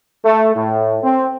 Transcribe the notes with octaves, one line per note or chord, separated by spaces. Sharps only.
A3
A2
C4